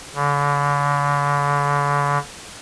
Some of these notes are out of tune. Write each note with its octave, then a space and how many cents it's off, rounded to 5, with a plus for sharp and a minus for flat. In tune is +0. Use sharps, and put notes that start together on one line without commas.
D3 -40